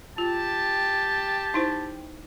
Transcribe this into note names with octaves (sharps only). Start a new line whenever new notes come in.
F4 G4 A5
D#4 E4 C5